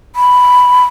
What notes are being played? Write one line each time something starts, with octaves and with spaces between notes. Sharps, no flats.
B5